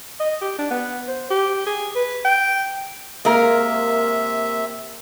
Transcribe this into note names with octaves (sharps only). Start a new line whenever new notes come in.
D#5
G4
D4
B3
C5
G4
G#4
B4
G5
C3 G#3 A#3 A#4 E5 F5